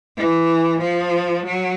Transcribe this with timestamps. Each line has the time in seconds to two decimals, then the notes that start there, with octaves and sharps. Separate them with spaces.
0.17 E3
0.80 F3
1.45 F#3